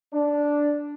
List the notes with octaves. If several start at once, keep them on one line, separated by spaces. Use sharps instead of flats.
D4